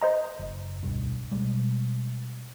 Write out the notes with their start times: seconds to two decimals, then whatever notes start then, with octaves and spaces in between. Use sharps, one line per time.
0.01 C5 D#5 A#5
0.39 F#1
0.82 D1 B1 G2
1.31 B2 G3 G#3